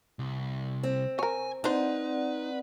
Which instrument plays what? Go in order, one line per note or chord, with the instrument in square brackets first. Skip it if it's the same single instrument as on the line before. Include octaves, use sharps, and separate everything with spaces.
[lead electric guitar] C2
[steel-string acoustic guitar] C4
[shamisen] A#4 C#5 [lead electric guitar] G#5
[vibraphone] C4 D5 F#5 [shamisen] D4 C5 [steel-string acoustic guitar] D#4 [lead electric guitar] B4